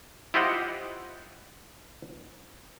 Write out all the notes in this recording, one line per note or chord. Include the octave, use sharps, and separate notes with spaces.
E4 F4 G4 C5 D#5 F#5